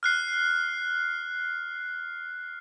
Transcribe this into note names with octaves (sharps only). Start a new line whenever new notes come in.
F6 F#6 C7